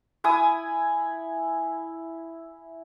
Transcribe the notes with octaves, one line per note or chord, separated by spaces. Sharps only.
E4 G#5 D#6